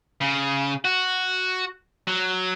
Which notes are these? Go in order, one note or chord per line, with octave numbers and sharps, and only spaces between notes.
C#3
F#4
F#3